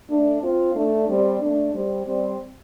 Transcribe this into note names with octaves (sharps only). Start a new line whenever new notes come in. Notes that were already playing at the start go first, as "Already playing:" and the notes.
A3 D4
C4 F4
A3 D4
G3 C4
A3 D4
G3 C4
G3 C4